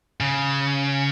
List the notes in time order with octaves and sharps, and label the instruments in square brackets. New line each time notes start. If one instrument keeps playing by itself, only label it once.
[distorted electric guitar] C#3